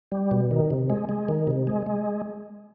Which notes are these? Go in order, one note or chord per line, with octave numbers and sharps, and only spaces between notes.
G3
B2
D#3
C3
G#3
G#3
D#3
C3
G#3
G#3